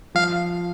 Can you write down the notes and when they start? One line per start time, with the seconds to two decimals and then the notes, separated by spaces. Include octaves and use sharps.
0.15 F3 F5